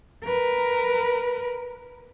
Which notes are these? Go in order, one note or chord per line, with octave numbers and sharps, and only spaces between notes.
A#4 B4